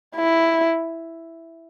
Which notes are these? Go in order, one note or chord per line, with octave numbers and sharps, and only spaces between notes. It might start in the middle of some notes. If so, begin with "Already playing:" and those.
E4